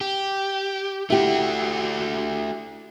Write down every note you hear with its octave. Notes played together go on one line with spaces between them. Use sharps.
G4
A3 E4 F#4 G4